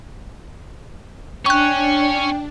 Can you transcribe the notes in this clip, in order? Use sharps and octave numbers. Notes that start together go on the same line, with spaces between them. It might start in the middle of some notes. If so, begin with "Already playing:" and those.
C#4 D4 G5 C#6 F#6